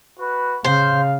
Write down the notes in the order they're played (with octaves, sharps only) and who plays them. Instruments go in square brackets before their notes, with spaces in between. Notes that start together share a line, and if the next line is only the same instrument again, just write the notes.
[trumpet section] F#4 B4
[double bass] C#3 [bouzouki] C5 [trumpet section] F5